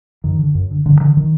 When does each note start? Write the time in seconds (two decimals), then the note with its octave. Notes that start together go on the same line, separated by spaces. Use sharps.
0.24 F#2 D#3
0.39 D3
0.55 F#2
0.71 D3
0.86 G2 D3
1.00 D3 D#3
1.17 D#3